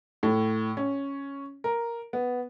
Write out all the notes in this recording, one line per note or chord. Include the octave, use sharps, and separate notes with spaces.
A2
C#4
A#4
B3